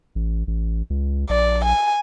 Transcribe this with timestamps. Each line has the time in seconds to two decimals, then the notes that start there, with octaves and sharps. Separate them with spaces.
0.15 A1
0.47 A1
0.90 C#2
1.29 A#1 D5
1.64 G#5